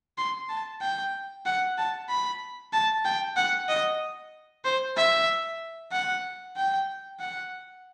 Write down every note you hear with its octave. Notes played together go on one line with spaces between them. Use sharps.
C6
A5
G5
F#5
A5
B5
A5
G5
F#5
D#5
C5
E5
F#5
G5
F#5